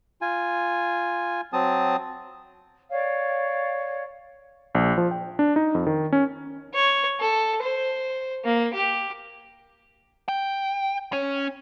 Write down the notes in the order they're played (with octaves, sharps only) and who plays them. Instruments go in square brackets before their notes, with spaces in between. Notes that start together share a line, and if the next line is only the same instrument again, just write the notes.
[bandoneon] F4 G#5
F#3 C4 A5 D#6
[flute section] C#5 D5 F5
[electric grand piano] A#1
F3
G5
D4
D#4
F2
D#3
C#4
[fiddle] C#5
A4
C5
A#3
G4
[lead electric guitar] G5
C#4